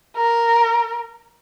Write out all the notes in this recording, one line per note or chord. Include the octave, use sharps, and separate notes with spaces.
A#4